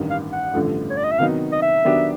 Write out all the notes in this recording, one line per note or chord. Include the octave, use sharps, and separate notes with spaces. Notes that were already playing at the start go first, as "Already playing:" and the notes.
Already playing: A1 G2 D#3
F5
F#5
A1 G2 D3 F3 A3
C#5
D5
D#5
E5
C3 D#3 F#3 B3 D#4 F5
D#5
E5
D#3 F#3 B3 D4 G4